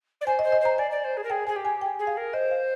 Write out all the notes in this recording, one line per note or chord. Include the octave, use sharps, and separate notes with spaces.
D5
C5 G#5
C5 D#5
D#5
C5 A#5
D5 G#5
D5
C5
G#4
A#4
G#4 G5
G#4 G#5
G4
G#5
G5
G#4
F5
A#4
C5 D#5
F5